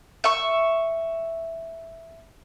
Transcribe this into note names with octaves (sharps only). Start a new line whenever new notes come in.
E5 C#6